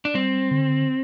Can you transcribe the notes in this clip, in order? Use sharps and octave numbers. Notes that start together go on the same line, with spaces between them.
D4
G3 C4
D3